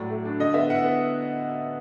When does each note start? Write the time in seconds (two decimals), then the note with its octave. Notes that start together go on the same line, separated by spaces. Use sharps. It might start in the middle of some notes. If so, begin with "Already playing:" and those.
Already playing: A2 F#3 D5
0.10 A3
0.25 D4
0.40 D3 D#5
0.54 B3 E5
0.70 E4 F#5
0.84 B3